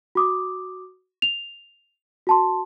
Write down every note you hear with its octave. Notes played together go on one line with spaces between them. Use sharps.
F#4 D6 D#6
F7
F#4 A5 C6